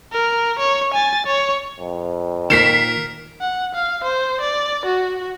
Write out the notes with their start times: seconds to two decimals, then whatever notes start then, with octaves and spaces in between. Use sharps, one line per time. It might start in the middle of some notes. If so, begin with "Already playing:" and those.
0.12 A#4
0.59 C#5
0.94 G#5 A6
1.26 C#5
1.80 F2
2.50 A#2 D#3 A#4 B6 C7 E7
3.41 F#5
3.74 F5
4.04 C5
4.41 D5
4.85 F#4